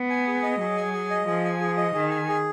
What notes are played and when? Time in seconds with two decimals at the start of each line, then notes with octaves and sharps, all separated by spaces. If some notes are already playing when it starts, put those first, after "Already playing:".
Already playing: B3
0.10 G#5
0.27 G#4
0.43 D#5
0.60 F#3 G#4
0.77 G#5
0.93 G#4
1.10 D#5
1.27 F3 G#4
1.45 G#5
1.60 G#4
1.77 D#5
1.94 D#3 G#4
2.11 G#5
2.28 G#4